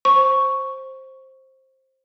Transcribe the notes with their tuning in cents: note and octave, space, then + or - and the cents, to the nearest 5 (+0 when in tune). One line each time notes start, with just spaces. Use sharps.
C5 +15 C#6 +0